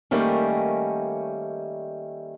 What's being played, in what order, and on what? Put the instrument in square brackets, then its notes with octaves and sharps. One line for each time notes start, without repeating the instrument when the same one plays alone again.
[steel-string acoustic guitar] D#3 G3 A3 A#3 C#4